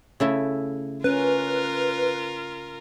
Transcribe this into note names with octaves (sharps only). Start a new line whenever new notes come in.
C#3 A3 E4
C#4 F4 A#4 B4